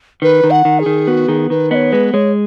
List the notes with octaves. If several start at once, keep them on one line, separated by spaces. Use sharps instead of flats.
D#3 B4
D#3
F#5
D#3
G#4
D#3
B3 F#4
D#3 G#4
D#3 B4
B3 C#5 D#5
G#3 B4
G#3 C#5